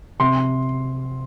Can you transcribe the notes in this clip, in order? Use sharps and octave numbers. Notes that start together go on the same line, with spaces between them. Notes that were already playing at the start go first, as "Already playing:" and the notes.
C3 C6